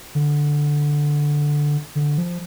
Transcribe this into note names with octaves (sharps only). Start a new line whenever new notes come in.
D3
D3
F3